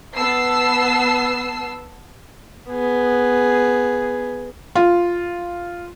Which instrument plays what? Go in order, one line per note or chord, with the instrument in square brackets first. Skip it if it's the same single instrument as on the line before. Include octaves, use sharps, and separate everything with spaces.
[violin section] B3 A5 E6 C7
[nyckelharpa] B3 G#4
[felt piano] F4